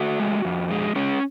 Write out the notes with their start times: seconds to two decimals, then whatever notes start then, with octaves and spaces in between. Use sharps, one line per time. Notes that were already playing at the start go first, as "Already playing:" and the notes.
Already playing: A3 F#4
0.20 G#3
0.45 F2
0.71 G#3
0.96 G#3 C#4